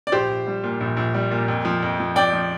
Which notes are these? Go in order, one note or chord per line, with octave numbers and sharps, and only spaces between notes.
D5
A#1 G4 C5
A#1
G3
A#2
A#1
A#1
G3
A#2
F2
F3
F2
F3
F2 D5 G5
F3